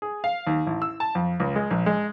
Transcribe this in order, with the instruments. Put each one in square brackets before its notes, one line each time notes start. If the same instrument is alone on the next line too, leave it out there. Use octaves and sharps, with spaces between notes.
[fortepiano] G#4
F5
D#2
A1
E6
A5
F2
C#2
G#3
A#1
G#3